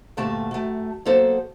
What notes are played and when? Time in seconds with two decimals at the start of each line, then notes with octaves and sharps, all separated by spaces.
0.17 D2 G2 A#2 G3 A3 A5
0.51 F#2 A3
1.05 F#3 A#3 B3 A4 C5